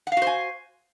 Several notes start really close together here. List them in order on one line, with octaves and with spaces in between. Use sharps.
F#5 F5 F#4 C5 G#5